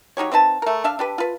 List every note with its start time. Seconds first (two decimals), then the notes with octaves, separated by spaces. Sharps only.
0.17 F#3 D#4 G4 C#5
0.32 C4 D#4 B4 A5
0.62 A3 A#4
0.84 D4 E5 F5
0.99 D4 G4 B4
1.18 F4 B4